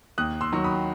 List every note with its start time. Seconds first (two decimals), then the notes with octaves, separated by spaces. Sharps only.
0.18 D#2 D#6 F#6
0.41 C6 E6
0.52 D#3 F#3
0.64 B5 D#6